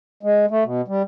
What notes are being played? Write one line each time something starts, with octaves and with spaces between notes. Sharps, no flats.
G#3
A3
B2
G3